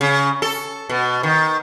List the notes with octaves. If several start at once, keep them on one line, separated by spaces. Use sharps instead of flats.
C#3
A4
B2
D#3